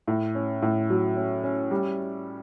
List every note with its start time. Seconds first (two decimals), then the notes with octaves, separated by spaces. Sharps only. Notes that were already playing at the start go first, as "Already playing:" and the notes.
0.08 A2
0.35 C#4
0.62 A2
0.90 F#3
1.17 C#4
1.44 C#4
1.71 G3